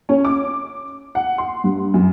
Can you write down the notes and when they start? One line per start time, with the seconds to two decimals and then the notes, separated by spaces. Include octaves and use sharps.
0.09 C#4
0.25 D6
1.15 F#5
1.38 C6
1.64 G2
1.94 F#2